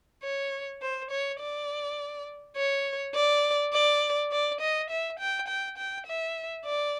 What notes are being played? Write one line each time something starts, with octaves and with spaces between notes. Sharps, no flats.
C#5
C5
C#5
D5
C#5
D5
D5
D5
D#5
E5
G5
G5
G5
E5
D5